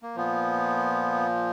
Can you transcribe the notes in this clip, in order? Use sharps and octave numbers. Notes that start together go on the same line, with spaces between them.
A#3
A#2 F3 B3